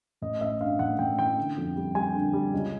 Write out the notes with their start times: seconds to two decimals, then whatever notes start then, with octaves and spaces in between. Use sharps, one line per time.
0.21 A1 D#5
0.41 A1 E5
0.60 G2 F5
0.79 A1 F#5
0.99 A1 G5
1.19 E3 G5
1.37 D3
1.57 F2
1.76 G3
1.95 G3 G#5
2.14 D3
2.33 G3
2.54 C#2